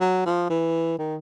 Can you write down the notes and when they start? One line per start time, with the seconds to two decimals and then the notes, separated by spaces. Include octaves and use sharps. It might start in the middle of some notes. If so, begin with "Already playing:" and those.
0.01 F#3
0.26 F3
0.50 E3
0.99 D#3